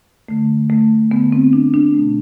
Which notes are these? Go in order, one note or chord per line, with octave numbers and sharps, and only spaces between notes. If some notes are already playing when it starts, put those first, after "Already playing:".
D3 A3
A3
D3 A3 B3
C4
D4
D4
B2 A3